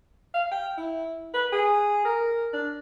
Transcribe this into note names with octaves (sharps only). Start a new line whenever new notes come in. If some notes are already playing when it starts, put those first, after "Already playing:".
F5
G5
E4
B4
G#4
A#4
D4